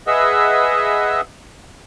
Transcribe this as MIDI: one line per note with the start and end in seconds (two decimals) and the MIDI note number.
0.07 1.21 68
0.07 1.21 71
0.07 1.21 75
0.07 1.21 76
0.07 1.21 78
0.07 1.21 88